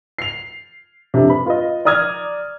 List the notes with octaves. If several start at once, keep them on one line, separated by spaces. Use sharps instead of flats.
C7 F7
F2 C3 D4
B4 B5
F4 B4 D#5
D5 A#5 D#6 F6 G#6